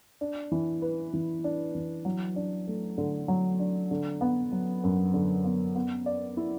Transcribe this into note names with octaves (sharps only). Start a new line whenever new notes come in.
D4
E3
B4
E3
D4
E3
F#3
D4
A3
D3
F#3
D4
D3
B3
F#3
F#2
D3
B3
B3
D5
E4